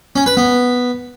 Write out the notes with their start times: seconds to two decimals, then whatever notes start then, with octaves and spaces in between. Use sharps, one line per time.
0.16 C#4
0.26 B4
0.37 B3